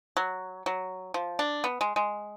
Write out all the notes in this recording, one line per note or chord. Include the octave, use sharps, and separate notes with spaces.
F#3
F#3
F3
D4
B3
G#3
G#3